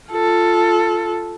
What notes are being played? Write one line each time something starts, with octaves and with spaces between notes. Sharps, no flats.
F4 A4